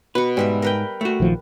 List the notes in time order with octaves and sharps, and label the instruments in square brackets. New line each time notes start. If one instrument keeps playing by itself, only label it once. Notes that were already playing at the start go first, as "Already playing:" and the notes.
[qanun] B2 C#6 [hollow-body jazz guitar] B4
[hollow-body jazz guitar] G#2 [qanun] G3 B4 E5
[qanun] A#4 B4 G5
[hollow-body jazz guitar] A3 F#4
[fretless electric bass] A#1 D#3 F3